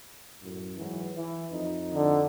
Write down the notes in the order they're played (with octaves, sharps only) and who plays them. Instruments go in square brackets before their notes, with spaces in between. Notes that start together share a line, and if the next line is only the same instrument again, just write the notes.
[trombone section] F#2 A2
G#2 E3 F#3
E3
F2 D#4
[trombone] D3